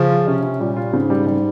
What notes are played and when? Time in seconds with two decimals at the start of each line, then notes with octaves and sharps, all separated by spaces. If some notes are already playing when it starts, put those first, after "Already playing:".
Already playing: C#3 F3
0.11 F4
0.27 C3 C#4
0.43 C#4
0.60 A#2 G3
0.76 F4
0.93 G#2 C#3
1.10 G3
1.27 G3